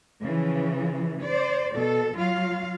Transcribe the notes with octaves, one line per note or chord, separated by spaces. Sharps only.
C#3 E3 F3
C5 D5
B2 A4
F#3 F4 F5